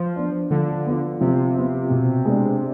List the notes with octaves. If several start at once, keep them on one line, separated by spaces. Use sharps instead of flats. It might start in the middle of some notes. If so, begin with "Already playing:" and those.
Already playing: F3
B3 D4
D3 F3
B3 F4
C3 F3
B3 F4
B2
G#3 B3 D4